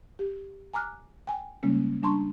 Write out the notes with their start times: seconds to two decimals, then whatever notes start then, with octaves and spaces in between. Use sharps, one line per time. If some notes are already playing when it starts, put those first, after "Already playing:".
0.19 G4
0.73 G#5 A#5 D6 F6 F#6
1.27 G5 G#5
1.63 C#3 G3 G#3 A#3 C#4
2.03 G3 D4 A5 A#5 C6 C#6